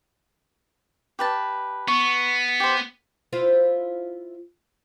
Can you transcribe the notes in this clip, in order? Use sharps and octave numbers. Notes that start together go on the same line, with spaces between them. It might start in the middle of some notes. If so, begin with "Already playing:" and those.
G4 B4 A5
B3 C#6
G4 C5
E4 F4 C5